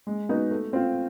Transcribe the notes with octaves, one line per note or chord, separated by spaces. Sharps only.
G#3
B3 D#4 F#4
A3
C4 F4